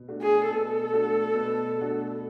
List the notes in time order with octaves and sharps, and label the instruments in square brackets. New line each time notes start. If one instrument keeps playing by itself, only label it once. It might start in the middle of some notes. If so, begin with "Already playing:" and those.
Already playing: [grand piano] B2
A3 D4 F#4
[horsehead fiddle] G#4
[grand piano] B2 [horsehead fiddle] A4
[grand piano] A3 D4 F#4
B2
A3 D4 F#4